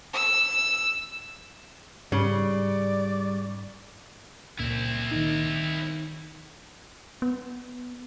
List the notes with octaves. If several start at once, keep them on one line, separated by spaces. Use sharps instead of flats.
E6
G#2 C#3 G3 D5
C#2 A#2 C4 E4
D#3 D#4
B3